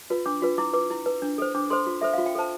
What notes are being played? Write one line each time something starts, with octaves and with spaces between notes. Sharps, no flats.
F4 B4
D4 D6
F4 B4
E4 D6
B4 D6
E4
B4
D4
A4 C5
D4 D6
A4 C5 C6
F4
A4 C5 E5
F4 F5
G5
A4 C5 A5